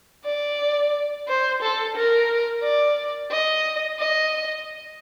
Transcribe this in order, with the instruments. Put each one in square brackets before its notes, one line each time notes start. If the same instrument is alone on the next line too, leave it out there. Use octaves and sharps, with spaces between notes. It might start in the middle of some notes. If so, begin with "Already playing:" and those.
[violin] D5
C5
A4
A#4
D5
D#5
D#5